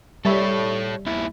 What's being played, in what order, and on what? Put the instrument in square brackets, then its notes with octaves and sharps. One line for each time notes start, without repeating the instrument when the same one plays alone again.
[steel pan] G3 E5 B5 [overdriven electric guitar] A4 C#5
[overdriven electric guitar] D#2 E4